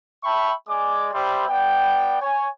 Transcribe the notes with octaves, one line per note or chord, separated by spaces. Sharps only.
E5 G5 A5 B5 C#6
G#3 D5 G#5 D6
G3 C5 E5 B5 C6
B3 D5 G5
C#5 G#5